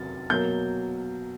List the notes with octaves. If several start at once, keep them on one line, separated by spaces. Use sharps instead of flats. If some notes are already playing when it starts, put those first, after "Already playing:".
Already playing: C3 F#3 A6
B2 F#3 A#3 G6